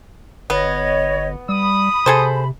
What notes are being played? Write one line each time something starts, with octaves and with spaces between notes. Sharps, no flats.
G1 B3 C#5 D#5
G3 B5 D#6
C3 G#4 A4 C5